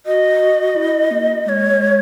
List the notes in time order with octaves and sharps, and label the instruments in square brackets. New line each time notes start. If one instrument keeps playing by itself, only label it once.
[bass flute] F#4 [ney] D#5
[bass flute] E4
A#3
[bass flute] G#3 [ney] C#5 D#5